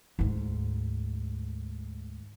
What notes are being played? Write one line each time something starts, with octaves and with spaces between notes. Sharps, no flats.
D2 G#2